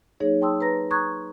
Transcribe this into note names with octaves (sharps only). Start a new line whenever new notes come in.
F#3 A#3 D#4 G#4 C#5
G5 A5 C6 D#6 E6
B4 A#5 A#6
A#5 C6 C#6 D#6 F#6 G#6